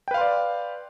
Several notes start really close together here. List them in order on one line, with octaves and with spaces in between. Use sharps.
G5 B4 F5 C6 D5